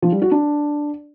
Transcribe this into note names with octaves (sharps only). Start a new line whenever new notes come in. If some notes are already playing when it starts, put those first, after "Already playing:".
F3
G3
F#4
D4